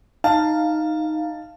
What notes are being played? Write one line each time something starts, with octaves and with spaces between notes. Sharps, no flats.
D#4 F5 A5